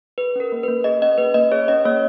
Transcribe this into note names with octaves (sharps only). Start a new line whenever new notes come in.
G#4 B4
C#4 A#4
A#3
A#3 B4
G#4 D#5
C#4 D#5
A#3 B4
A#3 D#5
G#4 C#5
C#4 D#5
A#3 C#5